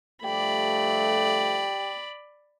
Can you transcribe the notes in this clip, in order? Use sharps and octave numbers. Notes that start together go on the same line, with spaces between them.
G2 F3 A3 G4 D5 B5